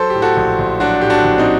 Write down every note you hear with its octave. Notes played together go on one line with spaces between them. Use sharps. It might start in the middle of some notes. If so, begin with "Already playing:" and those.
Already playing: F#3 A4 C5
G4
A2
F#4 A4
A#1
A#1
F#3 D4 F#4
A2 G4
D4 F#4
A#1
C4 D#4